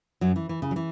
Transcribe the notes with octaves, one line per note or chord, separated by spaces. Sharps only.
F#2 F#3
E3
E3
C#3
F#3
E3